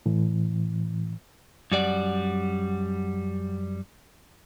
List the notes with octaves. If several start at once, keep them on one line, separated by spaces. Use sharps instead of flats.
A2 E3
F#2 G3 D5 F#5